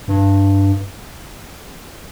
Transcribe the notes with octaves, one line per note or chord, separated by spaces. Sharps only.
G2